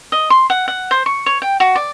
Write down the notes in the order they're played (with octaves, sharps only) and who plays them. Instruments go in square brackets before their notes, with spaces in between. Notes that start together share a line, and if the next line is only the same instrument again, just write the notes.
[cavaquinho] D#5
C6
F#5
F#5
C5
C#6
C#5
G5
F#4
D5